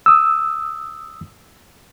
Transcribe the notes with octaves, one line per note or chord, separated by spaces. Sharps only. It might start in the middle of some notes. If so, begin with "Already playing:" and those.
D#6 E6